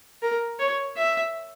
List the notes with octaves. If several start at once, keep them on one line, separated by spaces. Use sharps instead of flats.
A#4
C#5
E5